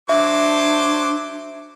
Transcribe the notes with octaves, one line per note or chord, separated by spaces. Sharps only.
F#3 D4 C5 E5 D6